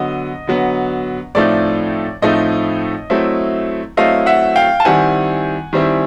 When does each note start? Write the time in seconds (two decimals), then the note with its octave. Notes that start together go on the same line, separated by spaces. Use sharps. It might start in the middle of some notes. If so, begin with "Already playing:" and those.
Already playing: D3 F#3 B3 D#5
0.47 D3 F#3 B3
1.35 A2 F3 A3 C4 D#4 D5
2.22 A2 F3 A3 C4 D#4 D#5
3.10 F#3 A3 C4 E4
3.97 F#3 A3 C4 E4 D#5 F5
4.26 E5 F#5
4.56 F5 G5
4.80 A5
4.85 D#3 G3 C4 E4 F#5 G#5
5.73 D#3 G3 C4 E4